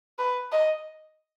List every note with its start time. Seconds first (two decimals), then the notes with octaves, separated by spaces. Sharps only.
0.19 B4
0.52 D#5